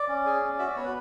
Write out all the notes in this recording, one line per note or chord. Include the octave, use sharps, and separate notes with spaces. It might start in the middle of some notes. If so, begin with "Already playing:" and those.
Already playing: D5
C#4
G#4
C#4
F#4 E5
D5
B3 C#5
B4